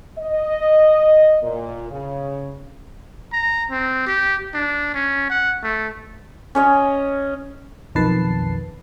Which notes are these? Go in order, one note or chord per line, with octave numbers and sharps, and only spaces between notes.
D#5
A#2
C#3
A#5
C4
G4
D4
C#4
F#5
A3
C#4 C#5 D#5
B1 F2 D#3 B4 A5 C7